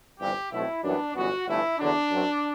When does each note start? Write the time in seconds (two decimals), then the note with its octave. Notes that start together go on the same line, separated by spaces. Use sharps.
0.20 G1 G2 E3 G3 C4 G4
0.51 B1 B2 A3 C4 E4
0.83 F#2 E3 G3 B3 D4
1.15 G1 F#2 E3 B3 F#4
1.47 G1 G2 E3 A3 E4
1.79 E2 D3 F#3 D4
2.11 F#2 F#3 C4